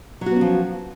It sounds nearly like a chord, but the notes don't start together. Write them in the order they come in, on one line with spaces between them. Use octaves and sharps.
F#3 F#4 B3 C#4 F3